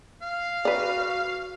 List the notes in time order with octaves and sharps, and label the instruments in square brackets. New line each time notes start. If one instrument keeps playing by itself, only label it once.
[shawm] F5
[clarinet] F#4 [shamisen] B4 D5